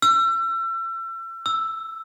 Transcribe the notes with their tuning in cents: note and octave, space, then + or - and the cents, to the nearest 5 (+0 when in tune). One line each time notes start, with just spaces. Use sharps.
E6 +35
E6 +0